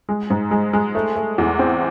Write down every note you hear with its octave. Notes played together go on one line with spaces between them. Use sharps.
G#3
G#2
G#3
G#3
A3
A3
E2
C4